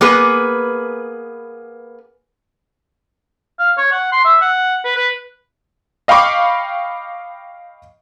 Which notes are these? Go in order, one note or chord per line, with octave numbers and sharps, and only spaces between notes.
A#3 B3 G#4 B4
F5
C#5
F#5
C6
E5
F#5
B4
B4
D#5 F5 G5 B5 C#6 D6